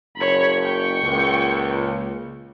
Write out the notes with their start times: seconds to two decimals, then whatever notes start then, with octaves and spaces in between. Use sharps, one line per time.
0.16 F#1 C#5 B5
0.59 G5 C#6
1.02 C#2 A#2